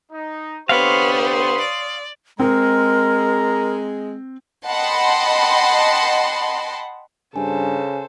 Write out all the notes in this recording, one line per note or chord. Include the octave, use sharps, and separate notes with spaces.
D#4
D3 B3 G4 C5 C#5 F5 C6 D#6
D5
G#3 C4 A#4 A#5
D#5 F#5 G5 A5 B5 C6
G2 C#3 A4 C5 G#5